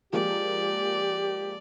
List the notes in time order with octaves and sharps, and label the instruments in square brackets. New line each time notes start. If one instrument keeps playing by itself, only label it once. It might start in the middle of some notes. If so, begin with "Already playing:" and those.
[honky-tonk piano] F3 G#3 A#3 [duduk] G4 [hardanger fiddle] D5